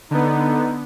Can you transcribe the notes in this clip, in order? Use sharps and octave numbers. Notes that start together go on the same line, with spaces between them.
D3 B3 D#4